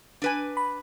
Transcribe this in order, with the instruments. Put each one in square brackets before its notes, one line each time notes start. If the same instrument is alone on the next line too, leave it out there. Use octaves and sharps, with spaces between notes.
[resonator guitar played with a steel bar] D4 B4 G#5
[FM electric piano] B5